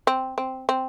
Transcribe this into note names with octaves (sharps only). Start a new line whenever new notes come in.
C4
C4
C4